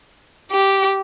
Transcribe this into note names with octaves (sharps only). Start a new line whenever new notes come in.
G4